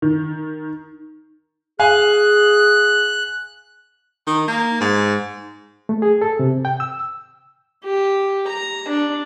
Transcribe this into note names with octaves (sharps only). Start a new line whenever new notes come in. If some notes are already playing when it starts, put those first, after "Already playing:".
D#3
G#4 F5 G#5 F#6
D#3
A#3
G#2
A3
G#4
A4
C3
G5
E6
G4
A#5
D4